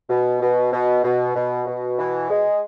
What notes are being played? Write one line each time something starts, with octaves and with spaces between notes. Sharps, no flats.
B2
B2
B2
B2
B2
B2
E3
G#3